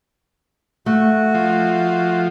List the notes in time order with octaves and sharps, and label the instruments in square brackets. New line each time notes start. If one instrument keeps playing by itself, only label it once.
[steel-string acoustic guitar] A3 [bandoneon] F#4
[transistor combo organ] F3